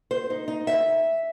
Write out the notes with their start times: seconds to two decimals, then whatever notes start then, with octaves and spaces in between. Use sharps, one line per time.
0.11 C5
0.30 D#4
0.48 D#4
0.67 E5